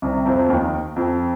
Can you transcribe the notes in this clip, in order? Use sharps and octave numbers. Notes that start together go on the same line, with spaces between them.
C2 C3
F2 F3
D#2 D#3
F2